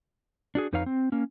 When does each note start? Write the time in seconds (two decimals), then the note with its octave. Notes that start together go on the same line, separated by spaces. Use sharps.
0.55 D4 F#4 G#4
0.73 F2 D#4 B4 C#5 F5 A#5
0.86 C4
1.12 A#3 C#4